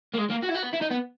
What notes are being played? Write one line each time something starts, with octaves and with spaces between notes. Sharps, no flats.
A#3
G#3
A#3
F#4
E4
F#4
B3
E4
D#4
B3